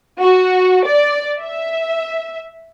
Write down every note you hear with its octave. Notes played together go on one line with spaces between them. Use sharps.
F#4
D5
E5